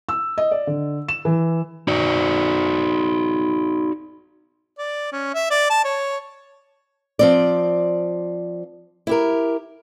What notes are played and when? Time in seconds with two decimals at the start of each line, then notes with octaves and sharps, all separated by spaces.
0.09 E6
0.38 D#5
0.51 D5
0.67 D3
1.09 E7
1.25 E3
1.87 D#4 F#4 D5
4.78 D5
5.12 C#4
5.34 E5
5.51 D5
5.70 A5
5.85 C#5
7.19 F3 C4 D5
9.07 E4 G4 A#4